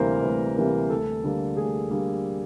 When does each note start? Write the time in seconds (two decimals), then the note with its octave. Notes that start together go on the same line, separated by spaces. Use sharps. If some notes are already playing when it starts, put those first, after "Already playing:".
Already playing: D2 C3 E3 G3 A#3 A#4 C5
0.23 D2 B4
0.56 C3 E3 G3 A#3 A#4
0.90 D2 A4
1.24 D3 G3 A#3
1.57 D2 G#4
1.90 D3 G3 A#3